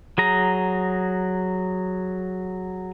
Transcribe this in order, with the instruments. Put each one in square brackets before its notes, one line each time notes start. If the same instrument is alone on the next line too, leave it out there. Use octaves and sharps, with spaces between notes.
[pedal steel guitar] F#3 G#4 A#5